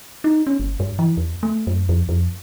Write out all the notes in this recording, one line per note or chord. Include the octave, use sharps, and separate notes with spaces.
D#4
C#4
G1
G2
E3
E2
A3
F#2
F2
F2